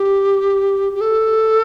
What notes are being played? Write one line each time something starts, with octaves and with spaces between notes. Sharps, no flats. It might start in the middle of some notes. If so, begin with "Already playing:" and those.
Already playing: G4
G4
A4